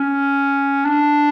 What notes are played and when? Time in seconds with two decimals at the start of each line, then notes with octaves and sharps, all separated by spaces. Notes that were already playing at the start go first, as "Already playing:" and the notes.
Already playing: C#4
0.85 D4